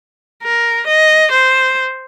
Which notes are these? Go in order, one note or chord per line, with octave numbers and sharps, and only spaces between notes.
A#4
D#5
C5